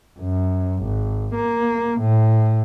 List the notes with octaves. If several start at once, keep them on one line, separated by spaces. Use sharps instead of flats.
F#2
G#1
A#3
A2